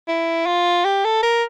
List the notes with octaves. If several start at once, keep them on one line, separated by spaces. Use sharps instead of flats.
E4
F4
G4
A4
A#4